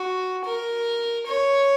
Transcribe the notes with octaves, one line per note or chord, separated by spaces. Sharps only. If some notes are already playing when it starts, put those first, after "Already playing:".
Already playing: F#4
A#4
C#5